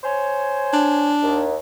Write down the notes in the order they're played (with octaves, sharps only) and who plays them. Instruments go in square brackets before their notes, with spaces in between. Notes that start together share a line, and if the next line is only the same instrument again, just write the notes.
[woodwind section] C5 C#5 G#5
[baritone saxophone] D4
[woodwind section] D#2